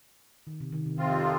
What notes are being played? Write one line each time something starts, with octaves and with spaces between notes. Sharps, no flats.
D#3
C3
D#3
C3
F2 C3 D#3 F3 C4 F4